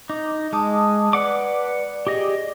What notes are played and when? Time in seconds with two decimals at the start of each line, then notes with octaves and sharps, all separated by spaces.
0.10 D#4 D6
0.53 G#3 A5 D6 D#6
1.13 B4 D5 F#5 D6
2.07 G4 G#4 D#5